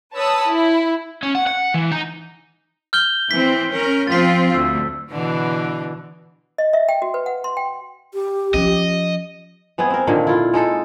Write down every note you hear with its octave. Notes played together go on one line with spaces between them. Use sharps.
B4 C#5 A5 B5 D#6 E6
E4
C#4
F#5
F#5
E3
D#4
F6 G6 G7
E3 C4 B6
C#4 A#4
F3 C4 F4 A6 B6
D2 E6
B2 D3 E3
D#5
E5
G5
F#4
B4
F#5
C6
G5
G4
F3 C#4 D#5
G#3 B3 C4 G#4
C4 A#4
A#2 D3 D#3
E4 F4
G#3 D#4 A4